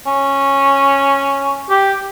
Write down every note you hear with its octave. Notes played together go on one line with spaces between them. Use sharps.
C#4
G4